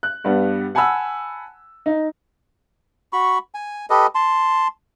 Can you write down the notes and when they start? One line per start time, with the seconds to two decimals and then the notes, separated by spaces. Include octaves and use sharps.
0.03 F#6
0.24 G2 G3 B3
0.75 F#5 G#5 A5 B5 E6
1.86 D#4
3.13 F#4 B5 C#6
3.54 G#5
3.90 G4 A4 B4 D#5
4.15 A5 C6